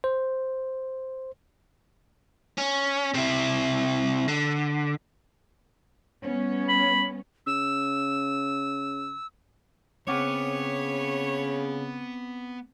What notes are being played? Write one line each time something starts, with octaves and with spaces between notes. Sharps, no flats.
C5
C#4
C3 E4
D3
G3 B3 C#4
B5
C#3 E6
C#3 B3 C4 C#5 F#5 D6